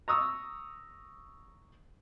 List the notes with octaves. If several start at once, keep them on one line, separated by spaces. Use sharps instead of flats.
A#5 C#6 D#6 E6